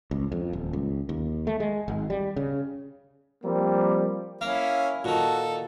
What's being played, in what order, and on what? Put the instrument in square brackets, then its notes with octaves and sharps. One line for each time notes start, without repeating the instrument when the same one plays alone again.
[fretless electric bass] C#2
F2
D#1
C#2
D#2
A3
G#3
G#1
G3
C#3
[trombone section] F3 G3 A#3 C4
[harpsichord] A#3 [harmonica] C#4 E4 [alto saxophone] F5
[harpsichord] A#2 D#3 [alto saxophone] F#4 [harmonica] A4